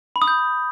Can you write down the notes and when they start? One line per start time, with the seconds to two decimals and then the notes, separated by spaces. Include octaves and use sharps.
0.16 B5
0.22 D#6
0.28 G6